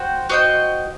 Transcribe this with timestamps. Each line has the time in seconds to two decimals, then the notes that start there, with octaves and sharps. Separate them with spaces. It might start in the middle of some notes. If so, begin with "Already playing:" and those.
Already playing: F#4 C5 G5
0.29 F#4 C5 D#5 G5